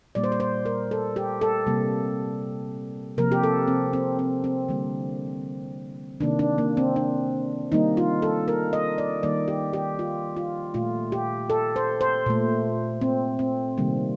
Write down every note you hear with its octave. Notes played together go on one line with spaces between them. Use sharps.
A#2 G3 A#3 D5
C5
D5
C5
A#4
A4
G4
A4
C3 G3 A#3
C3 F3 A#3 A#4
G4
A4
C4
C4
C4
C4
D3 G3 A#3
C3 D#3 A#3 D4
D4
A#3
C4
D4
D#3 G3 A#3 D#4
F4
A4
A#4
D#5
D5
D#3 G3 A#3 D5
G4
G4
F4
F4
A#2 A3 F4
G4
A4
C5
C5
A#2 A3
C4
C4
C3 D#3 G3 A#3